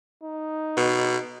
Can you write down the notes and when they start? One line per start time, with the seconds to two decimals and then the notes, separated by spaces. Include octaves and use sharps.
0.23 D#4
0.77 B2